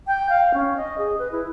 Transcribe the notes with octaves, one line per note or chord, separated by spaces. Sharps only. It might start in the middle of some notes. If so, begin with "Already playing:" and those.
G5
F5
C#4
D#5
G#4
B4
E4